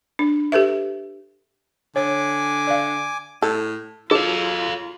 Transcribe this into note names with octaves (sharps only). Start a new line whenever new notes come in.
D4
G4 A4 B4 E5
D3 C#5 G#5 D6
D5 F5
A2 A4
F4 F#4 G#4 A4 C#5 F5 A5